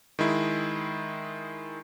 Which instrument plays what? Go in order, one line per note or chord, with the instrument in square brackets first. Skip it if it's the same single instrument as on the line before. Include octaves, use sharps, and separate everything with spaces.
[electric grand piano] D#3 G#3 E4